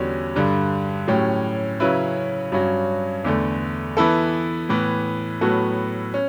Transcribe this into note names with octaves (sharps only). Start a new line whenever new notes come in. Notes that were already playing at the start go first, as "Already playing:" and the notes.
Already playing: E2 D3 G3 C#4 F#4
G2 D3 G3
A2 F#3 C#4 G4
C#3 F#3 C#4 E4 B4
G2 F#3 C#4 F#4
E2 D3 A3
E3 B3 E4 A4
A2 E3 B3
A2 F#3 B3 F#4 A4
C#4